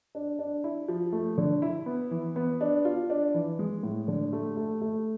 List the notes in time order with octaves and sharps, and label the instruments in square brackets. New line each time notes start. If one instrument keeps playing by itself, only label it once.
[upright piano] D4
D4
E4
F3
A3
D3
E4
B3
E3
B3
D4
F4
D4
E3
G#3
A2
D3
A3
A3
A3